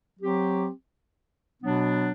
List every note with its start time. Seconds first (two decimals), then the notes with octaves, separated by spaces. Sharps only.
0.19 F#3 C4 G4
1.62 B2 F#3 B3 D4